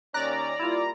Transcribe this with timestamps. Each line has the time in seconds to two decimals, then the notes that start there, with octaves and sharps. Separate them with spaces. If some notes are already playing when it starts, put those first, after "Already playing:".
0.14 D#2 C#4 D5 A#5 F#6 A#6
0.59 G3 A#3 E4 F4